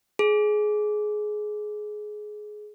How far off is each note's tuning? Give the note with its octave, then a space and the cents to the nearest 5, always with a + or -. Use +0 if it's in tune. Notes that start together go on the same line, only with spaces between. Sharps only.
G#4 +20